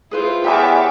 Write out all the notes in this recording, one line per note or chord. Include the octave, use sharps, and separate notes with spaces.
E4 F4 G#4 B4 C5
E2 G4 C#5 E5 G#5 D6